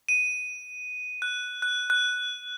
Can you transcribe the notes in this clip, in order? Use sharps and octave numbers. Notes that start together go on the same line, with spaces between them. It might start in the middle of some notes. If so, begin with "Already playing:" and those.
D#7
F#6
F#6
F#6